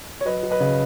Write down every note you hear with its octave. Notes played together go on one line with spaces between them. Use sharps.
C#5
F#3 B4 D#5
F#3
B4 D#5
C#3